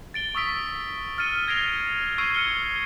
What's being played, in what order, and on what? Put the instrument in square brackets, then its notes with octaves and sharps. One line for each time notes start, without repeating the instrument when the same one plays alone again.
[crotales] A6 D7 G7
C#6 D#6 E6 B6 D7
F6 A6 C#7 D#7
G#6 A#6 C7 D7 F7 G7
C#6 E6 G#6 C7 D7 D#7
F6 C#7 G7